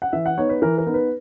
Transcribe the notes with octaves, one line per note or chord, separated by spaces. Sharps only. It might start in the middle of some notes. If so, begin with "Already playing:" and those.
F#5
E3 E5
F#5
B3 D#4 C#5
B4
E3 A#4
A#4
B3 D#4
B4